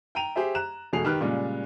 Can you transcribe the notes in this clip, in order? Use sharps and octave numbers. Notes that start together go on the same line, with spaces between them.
G5 A#5 D#7 F7
G4 G#4 C5 E5
A#5 F#6 E7
E1 B2 A3 G#4 C7 F7
D#3 G4 B4 F6 F#6
A#2 C#3 G3 G#3